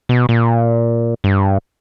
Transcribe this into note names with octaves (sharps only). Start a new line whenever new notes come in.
B2
A#2
G2